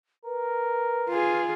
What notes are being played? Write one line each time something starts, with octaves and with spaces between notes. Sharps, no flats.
A#4 B4
F4 G#4